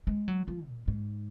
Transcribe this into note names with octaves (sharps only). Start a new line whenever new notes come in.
G#3
F#3
F3
A#2
G#2